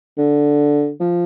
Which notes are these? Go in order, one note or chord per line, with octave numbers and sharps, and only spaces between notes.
D3
F3